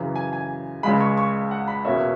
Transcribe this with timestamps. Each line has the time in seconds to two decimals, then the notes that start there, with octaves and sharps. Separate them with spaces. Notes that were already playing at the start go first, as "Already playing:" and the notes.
Already playing: F#2 C#3 E3
0.16 G#5
0.33 G#5
0.83 C#2 C#3 G#3 B5
1.00 C#6
1.17 C#6
1.51 F#5
1.68 B5
1.85 E2 B2 A#3 C#4 E5